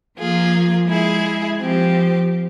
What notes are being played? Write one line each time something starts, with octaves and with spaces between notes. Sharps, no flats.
F3 A#3 F4 G#4
G#3 E4 G#4
F3 C4 G4